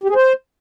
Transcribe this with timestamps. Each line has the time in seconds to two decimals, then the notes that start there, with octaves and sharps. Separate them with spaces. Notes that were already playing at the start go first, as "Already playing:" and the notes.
0.04 G4
0.09 G#4
0.15 C5